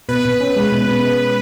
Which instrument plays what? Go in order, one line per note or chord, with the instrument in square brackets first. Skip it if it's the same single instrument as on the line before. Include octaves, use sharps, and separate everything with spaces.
[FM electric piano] B2 [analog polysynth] B4
[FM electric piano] B2
C#4
G#3
B2
B2